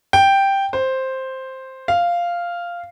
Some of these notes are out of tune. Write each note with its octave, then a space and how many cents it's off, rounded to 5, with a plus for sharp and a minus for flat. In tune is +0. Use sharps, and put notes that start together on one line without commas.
G5 +0
C5 +5
F5 -5